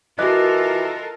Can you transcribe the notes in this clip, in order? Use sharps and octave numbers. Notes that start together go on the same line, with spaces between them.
E3 F4 F#4 A4 A#4 D#5 D6 F#6